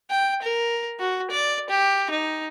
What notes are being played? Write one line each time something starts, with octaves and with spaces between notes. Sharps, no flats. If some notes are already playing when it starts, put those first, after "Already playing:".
G5
A#4
F#4
D5
G4
D#4